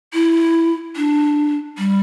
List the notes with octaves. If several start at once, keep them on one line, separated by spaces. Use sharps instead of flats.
E4
D4
G3